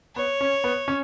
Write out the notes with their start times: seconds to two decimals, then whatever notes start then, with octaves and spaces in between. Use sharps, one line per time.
0.16 B3 C#5
0.41 C#4
0.64 B3
0.88 C#4